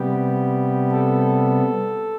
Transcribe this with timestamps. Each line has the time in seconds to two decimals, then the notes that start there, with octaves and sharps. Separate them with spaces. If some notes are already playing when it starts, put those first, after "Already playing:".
Already playing: C3 G3 B3 G4
0.91 A4